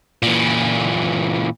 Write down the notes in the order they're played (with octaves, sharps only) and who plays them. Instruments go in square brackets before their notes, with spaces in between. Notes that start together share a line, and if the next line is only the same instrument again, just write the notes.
[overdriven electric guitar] A#2 E3